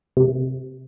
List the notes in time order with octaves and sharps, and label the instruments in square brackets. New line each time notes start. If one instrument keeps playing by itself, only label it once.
[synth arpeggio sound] C3